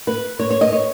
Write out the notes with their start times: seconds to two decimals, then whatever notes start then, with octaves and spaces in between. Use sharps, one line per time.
0.07 B4
0.40 C#5
0.51 C#5
0.61 D#5
0.73 C#5